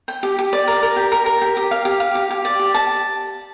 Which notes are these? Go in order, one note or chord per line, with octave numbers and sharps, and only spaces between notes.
G5
G4
G4
D5
A#4
A#4
G4
A#4
A#4
G4
G4
F5
G4
F5
G4
G4
D5
G4
A5